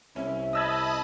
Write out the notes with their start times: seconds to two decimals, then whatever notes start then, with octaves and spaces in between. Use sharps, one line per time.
0.16 C2 C#4 E5
0.53 D#5 A5 B5 D#6 E6 G#6